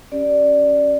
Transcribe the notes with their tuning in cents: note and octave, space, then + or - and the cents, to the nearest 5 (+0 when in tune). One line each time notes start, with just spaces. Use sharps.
C#4 +0 G4 +0 D5 +0